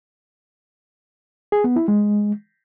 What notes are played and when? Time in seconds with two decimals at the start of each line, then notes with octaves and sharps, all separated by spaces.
1.52 G#4
1.64 B3
1.76 E4
1.88 G#3